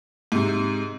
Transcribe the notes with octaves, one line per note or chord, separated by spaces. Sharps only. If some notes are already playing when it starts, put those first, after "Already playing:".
G#2 C3